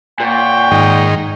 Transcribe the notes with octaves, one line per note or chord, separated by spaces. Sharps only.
A#2 C#5 F#5 G5
G#2 D#3